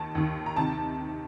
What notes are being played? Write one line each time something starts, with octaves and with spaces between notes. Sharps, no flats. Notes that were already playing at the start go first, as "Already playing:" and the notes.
Already playing: D#2 D#3 A5
D#2 D#3
A#5
C3 D#3 A5